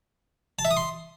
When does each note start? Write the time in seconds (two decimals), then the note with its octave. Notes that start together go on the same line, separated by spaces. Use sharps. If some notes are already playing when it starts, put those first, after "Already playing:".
0.59 A5
0.65 E5
0.71 D#6
0.77 C6